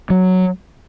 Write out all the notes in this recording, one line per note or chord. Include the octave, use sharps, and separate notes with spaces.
F#3